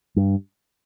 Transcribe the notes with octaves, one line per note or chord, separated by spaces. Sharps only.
G2